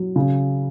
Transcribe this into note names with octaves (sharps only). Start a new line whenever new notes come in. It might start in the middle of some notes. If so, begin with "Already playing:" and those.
Already playing: F#3
C#3